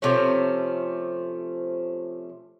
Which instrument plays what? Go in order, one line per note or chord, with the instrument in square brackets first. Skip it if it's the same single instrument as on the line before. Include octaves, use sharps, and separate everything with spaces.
[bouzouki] C3 F3 A3 C#4